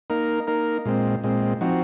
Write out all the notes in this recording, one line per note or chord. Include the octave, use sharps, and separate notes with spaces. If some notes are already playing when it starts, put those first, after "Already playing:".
A#3 D#4 A#4
A#3 D#4 A#4
A#2 G#3 C4
A#2 G#3 C4
F3 C4 D#4 F#4